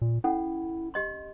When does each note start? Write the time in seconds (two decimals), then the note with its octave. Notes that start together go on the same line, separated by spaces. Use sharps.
0.02 A#2
0.24 C#4 E4 A4 F#5
0.94 G4 D#5 C6